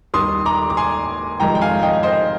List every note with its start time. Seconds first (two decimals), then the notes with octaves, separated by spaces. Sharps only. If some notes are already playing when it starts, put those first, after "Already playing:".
0.14 D#2 D#3 G3 C6 D#6
0.46 A#5 D6
0.70 D6
0.77 G#5 C6
1.40 F1 F2 D#3 G#3 G5 A#5
1.55 G5
1.61 F5 G#5
1.83 D#5 G5
2.03 C5 D#5